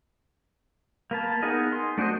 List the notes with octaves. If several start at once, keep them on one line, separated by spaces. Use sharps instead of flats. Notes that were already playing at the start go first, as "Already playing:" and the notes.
A#3 B4 A5
B3 D#4 G#4 A#4 D#5
C6
A3 D4 F#4 C5 D#5